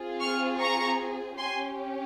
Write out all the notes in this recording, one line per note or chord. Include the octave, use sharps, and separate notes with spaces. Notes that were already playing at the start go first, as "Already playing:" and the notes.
Already playing: C4 F4 G#4
C#6 F6
A#5 C#6
C#4 G4 G#5 C6